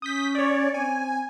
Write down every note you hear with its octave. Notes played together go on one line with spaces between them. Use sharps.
C#4 D#6 G6 B6
C#5 D5
C4 G#5